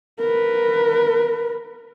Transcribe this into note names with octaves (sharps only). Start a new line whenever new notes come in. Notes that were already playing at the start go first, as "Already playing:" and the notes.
A#4 B4